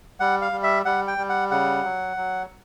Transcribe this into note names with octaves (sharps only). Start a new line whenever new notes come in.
G3 F#5
F5
G3
E5
G3 F#5
G5
G3
F#5
C#3 F#5
F#3
F#3